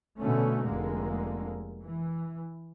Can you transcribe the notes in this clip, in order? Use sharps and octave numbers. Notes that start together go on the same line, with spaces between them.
B2 D3 A3 C#4
F1 D3 G#3 A#3
E3